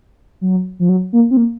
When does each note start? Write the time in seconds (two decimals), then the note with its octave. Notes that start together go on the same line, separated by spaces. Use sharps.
0.41 F#3
0.79 F3
0.89 F#3
1.13 A#3
1.31 C4
1.37 A#3